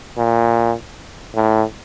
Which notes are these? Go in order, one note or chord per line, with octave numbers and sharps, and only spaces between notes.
A#2
A2